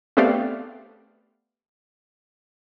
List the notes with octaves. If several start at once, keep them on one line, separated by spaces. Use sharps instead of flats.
A3 B3 C4 G4 D5 F5